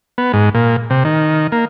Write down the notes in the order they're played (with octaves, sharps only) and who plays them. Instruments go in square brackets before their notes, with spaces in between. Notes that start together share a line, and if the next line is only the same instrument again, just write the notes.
[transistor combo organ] B3
G#2
A#2
C3
D#3
A#3